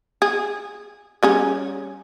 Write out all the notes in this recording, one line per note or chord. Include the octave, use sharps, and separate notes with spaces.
G#4
G3 C#4 G#4